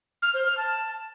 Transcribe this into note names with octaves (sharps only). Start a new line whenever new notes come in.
F6
C5
F6
A5